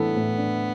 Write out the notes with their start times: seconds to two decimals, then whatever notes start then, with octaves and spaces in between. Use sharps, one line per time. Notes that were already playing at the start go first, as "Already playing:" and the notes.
Already playing: A2 E3 B3 D4 A4
0.16 A2
0.38 D4